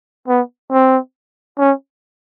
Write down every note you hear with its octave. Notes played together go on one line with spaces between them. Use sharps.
B3
C4
C#4